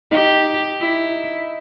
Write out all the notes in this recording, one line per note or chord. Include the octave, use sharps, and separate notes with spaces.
D#4 G4
E4